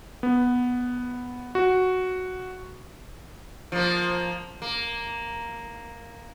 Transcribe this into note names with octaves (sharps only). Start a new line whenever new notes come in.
B3
F#4
F3 A#3
A#3